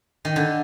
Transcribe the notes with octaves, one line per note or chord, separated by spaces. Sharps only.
D#3
D3